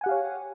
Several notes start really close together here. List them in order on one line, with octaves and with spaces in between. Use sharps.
G#5 F#5 G4 F5 C#5